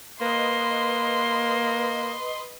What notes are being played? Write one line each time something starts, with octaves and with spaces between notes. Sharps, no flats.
A#3 B4 D#5 C6